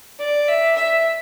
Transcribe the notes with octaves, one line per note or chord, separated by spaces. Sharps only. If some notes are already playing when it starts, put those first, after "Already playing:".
D5
E5
E5